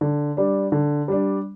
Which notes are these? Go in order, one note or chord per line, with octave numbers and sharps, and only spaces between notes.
D3
G3 D4
D3
G3 D4